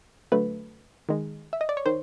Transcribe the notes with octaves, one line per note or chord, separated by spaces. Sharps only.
D3 F#3 A3 B4
D#3 G#3
E5
D#5
D5
C#5
D#3 C5